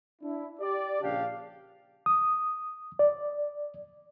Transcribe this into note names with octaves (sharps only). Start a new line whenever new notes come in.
D4 E4
G4 D5
A#1 C#3 D4 G4 F5
D#6
D5